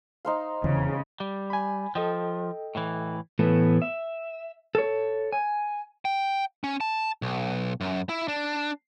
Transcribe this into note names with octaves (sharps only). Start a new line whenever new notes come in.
D#4 C5 F5
F1 E2 C#3 E3
G3
G#5 B5
F3 A4 D#5 G5
A2 E3
A2 E3 A3 B3
E5
A4 C#5
G#5
G5
C#4
A5
B1
F#2
E4
D4